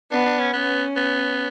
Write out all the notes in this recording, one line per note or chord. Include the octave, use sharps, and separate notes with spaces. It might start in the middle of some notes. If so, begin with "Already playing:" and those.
B3 D4
D4
C#4
B3 C#4
B3